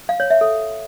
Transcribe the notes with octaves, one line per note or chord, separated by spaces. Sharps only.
F5
C#5
E5
A4